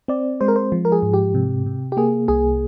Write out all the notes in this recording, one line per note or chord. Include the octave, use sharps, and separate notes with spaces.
C4 D5
G#3 C5
A#4
C5
F3
A#4
G#4
G#2
G4
C3
C3
G4
A#3 G#4
C2 G#4